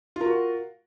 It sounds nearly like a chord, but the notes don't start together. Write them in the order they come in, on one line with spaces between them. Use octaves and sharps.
F4 A#4 F#4